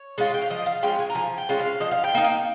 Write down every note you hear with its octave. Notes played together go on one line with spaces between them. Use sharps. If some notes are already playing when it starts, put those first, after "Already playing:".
Already playing: C#5
G#3 C#4 F4
G5
F5
F3 D#5
F5
G#3 C#4 F4 G5
G#5
A#5
F3 G#5
G5
G#3 C#4 F4
F5
F3 D#5
F5
G5
A#3 D#4
G5